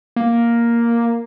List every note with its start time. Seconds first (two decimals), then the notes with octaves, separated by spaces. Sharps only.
0.16 A#3